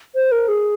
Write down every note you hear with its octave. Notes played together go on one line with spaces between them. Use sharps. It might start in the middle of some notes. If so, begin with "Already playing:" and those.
C5
A#4
G#4